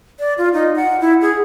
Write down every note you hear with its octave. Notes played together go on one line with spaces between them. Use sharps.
D5
F4
D#4
F#5
E4
G#4